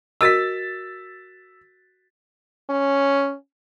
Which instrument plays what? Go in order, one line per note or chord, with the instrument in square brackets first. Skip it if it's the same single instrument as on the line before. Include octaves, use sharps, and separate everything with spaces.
[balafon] F#4 A#4 D#5 [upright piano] E6 A6 B6
[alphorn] C#4